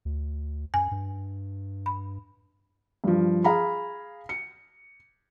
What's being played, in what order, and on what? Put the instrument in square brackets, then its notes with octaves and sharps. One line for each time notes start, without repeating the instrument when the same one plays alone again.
[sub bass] D2
[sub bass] F#2 [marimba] G#5
[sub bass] G2
[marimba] B5
[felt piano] G2 F3
G#4 F5 A#5 B5
C#7